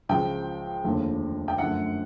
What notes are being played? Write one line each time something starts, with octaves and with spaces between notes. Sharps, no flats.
C#2 C#3 F3 G5
F1 D#2 D3 F3
G5
F#2 D3 F3 A3 F#5